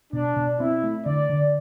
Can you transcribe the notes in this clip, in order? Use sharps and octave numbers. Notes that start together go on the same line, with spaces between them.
B2 D4
B2
C4 E4
A3
D3 D5
D3